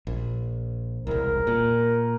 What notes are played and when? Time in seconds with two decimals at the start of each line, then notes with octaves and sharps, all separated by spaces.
0.07 A#1
1.07 E1 C2 A#4
1.47 A#2